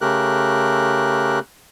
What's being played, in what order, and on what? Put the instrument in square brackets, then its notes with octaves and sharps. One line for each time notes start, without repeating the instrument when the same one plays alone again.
[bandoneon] C#3 A3 G4 A#4 F#6